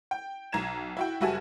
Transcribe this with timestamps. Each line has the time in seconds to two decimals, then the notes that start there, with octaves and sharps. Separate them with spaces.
0.11 G5
0.52 B1 A#5 G#6 E7
0.97 E4 F#4 G5
1.21 F#1 G3 F#4 E5 G#5 A5